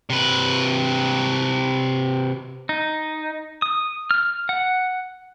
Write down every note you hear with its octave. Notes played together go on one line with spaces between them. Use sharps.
C3 B4
D#4
D#6
F6
F#5